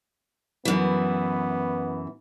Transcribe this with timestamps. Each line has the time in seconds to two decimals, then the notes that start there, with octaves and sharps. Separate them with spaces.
0.65 F#2 E3 B3